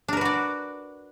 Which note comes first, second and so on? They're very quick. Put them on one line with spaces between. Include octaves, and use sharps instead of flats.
D4 A#4 B4 F#4 D5